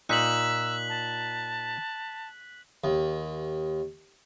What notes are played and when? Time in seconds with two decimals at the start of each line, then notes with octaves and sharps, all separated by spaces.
0.09 A#2 D#4 E6 F#6 B6 F#7
0.89 A5
2.84 D#2